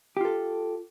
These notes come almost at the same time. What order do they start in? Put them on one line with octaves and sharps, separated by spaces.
G4 F4 A4